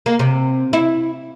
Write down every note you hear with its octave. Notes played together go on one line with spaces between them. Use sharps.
A#3
C3
E4